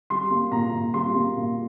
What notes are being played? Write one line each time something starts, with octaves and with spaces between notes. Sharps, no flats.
G3 C6
A#3
A#2 A#5
A#2
G3 C6
A#3
A#2